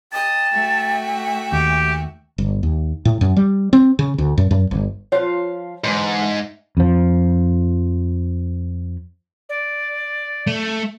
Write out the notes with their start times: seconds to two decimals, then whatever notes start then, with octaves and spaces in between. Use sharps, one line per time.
0.13 D#5 G5 A5
0.53 A3 F#4 E5
1.52 D#2 G4
2.38 G1
2.63 D#2
3.05 A2
3.21 F#2
3.36 G3
3.73 C4
3.99 C#3
4.18 D2
4.38 F#2
4.51 F#2
4.71 G1
5.12 F3 F4 C5 C#5 F5
5.84 G#2 D3 E3 G#3
6.22 E5
6.77 F2 F3
9.49 D5
10.47 A3